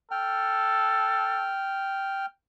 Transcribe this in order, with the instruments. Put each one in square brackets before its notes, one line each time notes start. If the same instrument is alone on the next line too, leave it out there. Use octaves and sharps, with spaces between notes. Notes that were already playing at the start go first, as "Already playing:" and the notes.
[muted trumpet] A4 [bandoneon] G5 F6